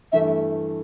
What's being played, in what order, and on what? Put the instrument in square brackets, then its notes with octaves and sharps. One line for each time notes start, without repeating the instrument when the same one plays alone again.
[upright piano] G2 E3 A3 [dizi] E5